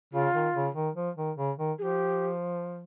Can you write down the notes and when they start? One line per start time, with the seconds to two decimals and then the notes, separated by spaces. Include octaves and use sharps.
0.13 C#3 F4
0.34 D#3
0.54 C#3
0.75 D#3
0.96 F3
1.17 D#3
1.37 C#3
1.58 D#3
1.78 F3 G#4
1.82 G4